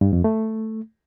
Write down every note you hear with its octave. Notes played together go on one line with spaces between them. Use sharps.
G2
F2
A3